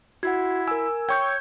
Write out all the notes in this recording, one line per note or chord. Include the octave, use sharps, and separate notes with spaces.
E4 F#4 F#5 G#6
A#4 G#5 E6
C#5 G5 C#6 G6 G#6